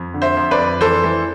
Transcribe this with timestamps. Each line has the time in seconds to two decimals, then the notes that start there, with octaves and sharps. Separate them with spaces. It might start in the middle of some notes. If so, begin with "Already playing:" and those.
Already playing: F2
0.14 D3
0.22 C5 E5
0.37 F2
0.51 B4 D5
0.58 F2
0.81 E3 A4 C5
1.04 E3